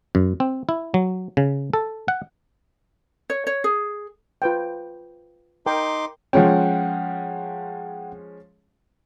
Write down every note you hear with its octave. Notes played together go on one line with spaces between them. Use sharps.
F#2
C4
E4
F#3
C#3
A4
F#5
C#5
C#5
G#4
F4 B4 G5
D#4 A#4 G5 C6 D6
F3 G#3 C#4 F#5 G5